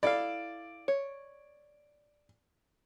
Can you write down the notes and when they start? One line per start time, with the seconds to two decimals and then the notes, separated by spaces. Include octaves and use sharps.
0.03 E4 A4 D5 F5
0.88 C#5